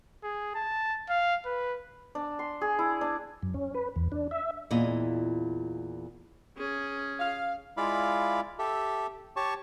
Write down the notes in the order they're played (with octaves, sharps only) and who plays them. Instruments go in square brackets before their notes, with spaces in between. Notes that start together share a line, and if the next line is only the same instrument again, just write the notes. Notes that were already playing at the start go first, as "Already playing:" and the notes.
[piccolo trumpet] G#4
A5
F5
B4
[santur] D4
C6
G#4
E4
D4
[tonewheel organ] F#2
C#4
B4
E2
D4
E5
[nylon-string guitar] E2 A#2 E4 F4 D#5
[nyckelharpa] C#4 G#4
[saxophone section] F5
[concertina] G#3 E4 F4 D5 F5 B5
G4 A4 E5
G4 C#5 A5 C#6